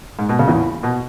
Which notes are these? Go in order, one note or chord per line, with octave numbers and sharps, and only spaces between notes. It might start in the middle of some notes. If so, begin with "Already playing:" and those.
G#2
B2
C#3
E2 E3
B2